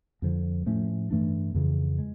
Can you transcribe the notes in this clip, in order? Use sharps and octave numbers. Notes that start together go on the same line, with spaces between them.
F2 D3 F3
A2 F3 A3 C#4
G2 E3 A3 D4
F2 C#3 E3
G#3